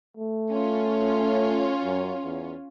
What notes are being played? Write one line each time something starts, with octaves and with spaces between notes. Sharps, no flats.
A3
C#4 F4
F#2
E2